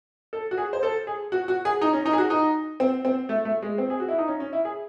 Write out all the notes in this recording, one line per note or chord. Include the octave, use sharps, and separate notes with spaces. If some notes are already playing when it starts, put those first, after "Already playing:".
A4
F#4
G#4
C5
A4
G#4
F#4
F#4
G#4
D#4
C#4
D#4
G#4
F#4
D#4
C4
C4
A3
A3
G#3
C4
G#4
F#4
E4
D#4
C#4
C#4
E4
G#4